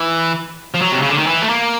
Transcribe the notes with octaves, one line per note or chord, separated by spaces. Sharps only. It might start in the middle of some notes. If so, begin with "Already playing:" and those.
Already playing: E3
F3
F#3
C3
C#3
D3
D#3
E3
A3
A#3